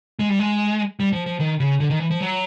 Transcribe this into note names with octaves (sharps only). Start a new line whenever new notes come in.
G#3
G3
G#3
G3
F3
F3
D#3
C#3
D3
D#3
E3
F3
F#3